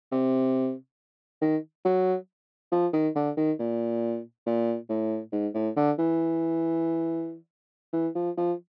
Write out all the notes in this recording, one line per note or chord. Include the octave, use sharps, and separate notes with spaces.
C3
D#3
F#3
F3
D#3
D3
D#3
A#2
A#2
A2
G#2
A2
D3
E3
E3
F3
F3